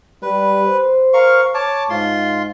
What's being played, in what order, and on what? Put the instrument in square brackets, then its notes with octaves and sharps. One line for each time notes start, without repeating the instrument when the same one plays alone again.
[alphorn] G3 [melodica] B4
[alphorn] C5
[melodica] A#4 F5 C#6
C#5 A5 D6
[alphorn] G#2 [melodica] F4 C6